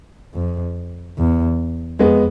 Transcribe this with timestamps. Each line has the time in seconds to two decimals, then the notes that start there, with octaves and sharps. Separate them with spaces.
0.34 F2
1.18 E2
1.99 F2 G#3 B3